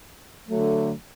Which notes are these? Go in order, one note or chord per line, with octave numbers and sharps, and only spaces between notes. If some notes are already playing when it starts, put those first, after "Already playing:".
D3 F#3 A3